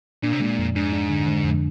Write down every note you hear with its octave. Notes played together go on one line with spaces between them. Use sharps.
A#2 D4
C3
A#2 G#3
F2
G#2 D4
D4
D3
D3
F2